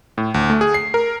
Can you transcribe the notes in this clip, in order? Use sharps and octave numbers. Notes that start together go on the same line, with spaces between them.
A2
D2
A3
G#4
C7
A#4